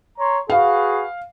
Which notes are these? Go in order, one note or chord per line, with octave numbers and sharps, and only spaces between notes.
C#5 A#5 C6
F#4 G#4 B4 F5